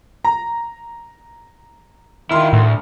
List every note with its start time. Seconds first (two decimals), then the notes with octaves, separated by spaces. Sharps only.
0.25 A#5
2.31 D#3 E4 F4 C6 F6
2.53 D2 A2